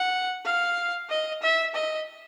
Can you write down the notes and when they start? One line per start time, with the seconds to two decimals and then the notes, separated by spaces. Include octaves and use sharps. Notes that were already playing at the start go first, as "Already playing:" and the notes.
Already playing: F#5
0.45 F5
1.09 D#5
1.42 E5
1.74 D#5